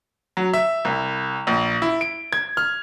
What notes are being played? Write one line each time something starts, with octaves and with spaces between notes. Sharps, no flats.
F#3
E5
C2
A#1
E4
D7
G#6
F6